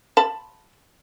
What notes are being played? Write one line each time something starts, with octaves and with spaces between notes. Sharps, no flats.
A5 B5